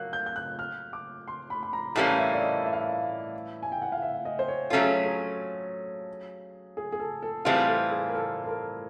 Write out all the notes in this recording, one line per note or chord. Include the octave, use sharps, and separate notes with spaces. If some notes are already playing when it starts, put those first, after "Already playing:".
Already playing: F#3 A#3 F#6
G6
G6
F#6
F6
D6
C6
B5
B5
A#5
A2 E3 G3 A#3 C#4 A5
E5
D5
D#5
E5
F5
E5
G#5
G5
F#5
F5
E5
D#5
C5
C#5
F#3 A3 C#4 F4 A4
G#4
G#4
G#4
G#4
A4
A4
A2 E3 G3 C4 F4 G#4
A4
G#4
A#4
A4
A4
A#4